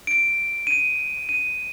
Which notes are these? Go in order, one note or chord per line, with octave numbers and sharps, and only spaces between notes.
D7
D#7
D#7